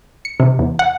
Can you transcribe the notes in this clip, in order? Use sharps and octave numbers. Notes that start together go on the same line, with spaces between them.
C#7
C3
E2
F#5